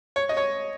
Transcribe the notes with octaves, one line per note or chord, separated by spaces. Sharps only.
C#5
D#5
C#5